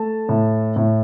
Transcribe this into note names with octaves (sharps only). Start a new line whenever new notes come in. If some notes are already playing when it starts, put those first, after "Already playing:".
Already playing: A3 A5
A2
A2